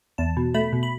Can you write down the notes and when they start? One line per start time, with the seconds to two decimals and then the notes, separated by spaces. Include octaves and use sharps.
0.18 E2 A5
0.37 B2
0.54 A3 B5
0.73 B2
0.83 B5